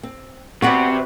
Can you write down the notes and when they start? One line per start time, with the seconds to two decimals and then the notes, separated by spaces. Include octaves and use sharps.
0.03 C4
0.62 C3 B3 C4 F#4 B4 D5 F#5